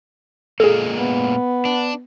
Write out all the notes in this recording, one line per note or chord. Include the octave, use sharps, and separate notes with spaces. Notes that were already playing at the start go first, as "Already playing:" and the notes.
A#2 G#3 A#3 G#4 A4
B3
D4